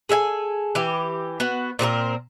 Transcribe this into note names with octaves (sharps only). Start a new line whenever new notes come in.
G#4 A4 D#5 G#5
E3 G4
B3 F#4
A#2 C4 F#4 A#4